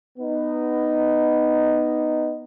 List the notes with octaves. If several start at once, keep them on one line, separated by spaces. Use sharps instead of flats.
B3 D#4